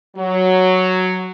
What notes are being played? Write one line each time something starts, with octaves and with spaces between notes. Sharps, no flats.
F#3